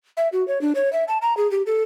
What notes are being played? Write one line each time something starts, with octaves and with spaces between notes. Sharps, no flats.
E5
F#4
C#5
D4
C#5
E5
A5
A#5
G#4
G4
A4